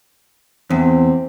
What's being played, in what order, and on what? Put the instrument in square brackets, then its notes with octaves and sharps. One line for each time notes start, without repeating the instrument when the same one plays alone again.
[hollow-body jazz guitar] E2 [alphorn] C4